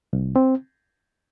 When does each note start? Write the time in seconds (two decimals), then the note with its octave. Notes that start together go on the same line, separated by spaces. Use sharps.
0.13 C2
0.36 C4